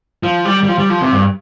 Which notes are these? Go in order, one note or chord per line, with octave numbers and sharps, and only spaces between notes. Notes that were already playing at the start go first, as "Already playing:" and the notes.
F3
G3
G3
F3
G3
F3
C3
G2